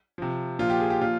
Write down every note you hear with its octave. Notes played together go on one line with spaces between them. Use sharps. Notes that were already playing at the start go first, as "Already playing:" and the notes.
C3 F3
A#2 F3 F4
G4
G#4
G4
A#2 F3 F4